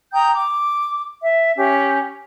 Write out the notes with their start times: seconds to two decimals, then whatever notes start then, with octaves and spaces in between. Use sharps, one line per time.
0.12 G5 A#5 D#6 G6
0.32 D6
1.21 E5
1.56 C#4 G4